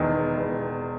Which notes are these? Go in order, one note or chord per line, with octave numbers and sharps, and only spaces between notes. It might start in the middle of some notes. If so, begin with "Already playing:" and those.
Already playing: E1 E2 D#3
E1